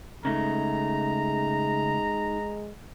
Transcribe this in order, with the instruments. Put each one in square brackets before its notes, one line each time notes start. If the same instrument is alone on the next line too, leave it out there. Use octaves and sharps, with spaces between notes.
[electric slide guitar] C#3 A3 [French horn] G#3 [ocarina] D#4 [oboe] A#5